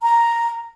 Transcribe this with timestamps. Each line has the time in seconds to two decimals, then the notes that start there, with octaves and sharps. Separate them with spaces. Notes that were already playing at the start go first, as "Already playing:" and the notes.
0.02 A#5